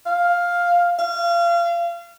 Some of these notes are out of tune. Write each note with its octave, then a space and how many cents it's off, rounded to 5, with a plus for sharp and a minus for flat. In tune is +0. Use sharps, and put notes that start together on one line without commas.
F5 +5
F5 -30